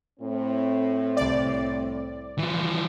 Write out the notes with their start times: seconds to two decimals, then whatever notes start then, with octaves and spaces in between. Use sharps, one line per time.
0.20 A2 C4
1.17 C2 D5
2.38 E3 F3